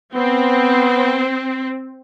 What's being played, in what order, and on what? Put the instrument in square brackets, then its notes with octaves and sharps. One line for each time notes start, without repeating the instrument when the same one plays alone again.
[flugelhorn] B3 [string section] C4